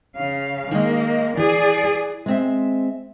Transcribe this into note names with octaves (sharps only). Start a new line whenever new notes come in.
C#3 F5
D#3 G#3 A#3 D#5
E3 G#4 D5
G#3 C4 E5